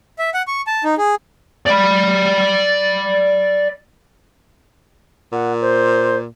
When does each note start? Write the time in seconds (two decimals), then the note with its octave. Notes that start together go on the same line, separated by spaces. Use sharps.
0.19 E5
0.34 F#5
0.48 C#6
0.67 A5
0.84 D#4
0.98 G#4
1.67 D5 B5
5.32 A#2 F#5
5.61 C5